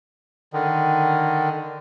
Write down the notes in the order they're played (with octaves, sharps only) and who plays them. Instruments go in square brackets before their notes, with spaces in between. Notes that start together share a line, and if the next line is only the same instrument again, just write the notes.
[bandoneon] D3 D#3